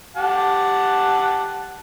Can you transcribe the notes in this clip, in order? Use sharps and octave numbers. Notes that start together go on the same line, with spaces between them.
G4 F#5 A5